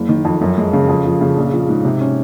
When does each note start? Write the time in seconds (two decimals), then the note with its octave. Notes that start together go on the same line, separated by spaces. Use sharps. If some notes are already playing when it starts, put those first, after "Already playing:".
Already playing: F#1
0.09 D#3
0.25 F2
0.41 F#2
0.58 G#3
0.73 C#3
0.89 F2
1.05 F3
1.21 C#3
1.37 A#1
1.53 F3
1.69 G#2
1.85 C3
2.01 C#4